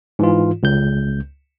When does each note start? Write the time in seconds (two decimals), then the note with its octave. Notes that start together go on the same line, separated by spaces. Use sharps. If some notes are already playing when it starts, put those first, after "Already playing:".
0.19 G#2 E3 F4
0.63 C#2 G6